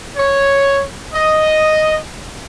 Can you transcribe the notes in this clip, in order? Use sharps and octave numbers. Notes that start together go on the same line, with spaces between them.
C#5
D#5